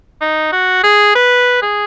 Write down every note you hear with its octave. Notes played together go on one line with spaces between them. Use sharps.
D#4
F#4
G#4
B4
G#4